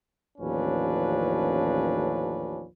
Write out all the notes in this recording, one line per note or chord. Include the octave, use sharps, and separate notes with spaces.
A1 D#2 F3 C#4 D4 B4